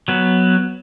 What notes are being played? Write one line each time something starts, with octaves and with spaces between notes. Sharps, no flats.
F#3 B3